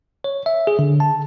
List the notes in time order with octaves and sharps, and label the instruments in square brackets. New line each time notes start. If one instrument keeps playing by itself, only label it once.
[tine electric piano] C#5
E5
G#4
D3
A5